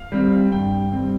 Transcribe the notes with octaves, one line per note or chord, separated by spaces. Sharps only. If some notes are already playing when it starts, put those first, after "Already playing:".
Already playing: F5
G3 C4
G2 G5
G3 C4